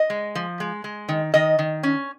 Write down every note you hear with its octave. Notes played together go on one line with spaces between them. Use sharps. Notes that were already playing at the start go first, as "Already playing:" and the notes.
Already playing: D#5
G#3
F3
G#3
G#3
D#3
D#3 D#5
D#3
C#4